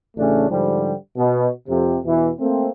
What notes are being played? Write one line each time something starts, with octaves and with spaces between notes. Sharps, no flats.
A1 C#3 A3 C#4 D4
G#2 D3 F3 G3
B2
F2 C3
E2 B2 E3
A3 A#3 C4